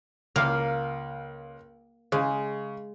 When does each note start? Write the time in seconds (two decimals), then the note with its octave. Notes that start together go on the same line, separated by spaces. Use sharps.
0.36 C#2 A#3 F5
2.12 C#3 G#3